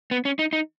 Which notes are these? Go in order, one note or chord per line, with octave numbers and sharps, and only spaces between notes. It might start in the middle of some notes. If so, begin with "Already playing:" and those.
B3
C#4
D#4
D#4